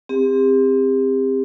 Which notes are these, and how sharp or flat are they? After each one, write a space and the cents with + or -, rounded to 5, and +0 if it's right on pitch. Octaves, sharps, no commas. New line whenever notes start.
C4 +0 G4 +40